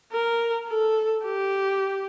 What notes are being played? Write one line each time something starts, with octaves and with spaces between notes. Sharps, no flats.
A#4
A4
G4